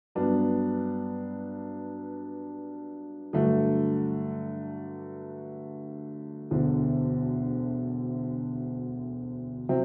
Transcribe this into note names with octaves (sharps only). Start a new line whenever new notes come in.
G2 F#3 B3 D4
G2 D3 F#3 A3
E1 D2 D3
C3 F#3 C4